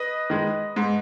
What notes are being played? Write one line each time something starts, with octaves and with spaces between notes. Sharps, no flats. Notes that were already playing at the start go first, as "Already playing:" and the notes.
Already playing: B4 D#5
D#3 G#3
G#2